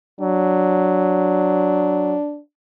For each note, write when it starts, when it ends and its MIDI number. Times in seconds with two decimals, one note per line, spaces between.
0.21 2.18 54
0.21 2.40 62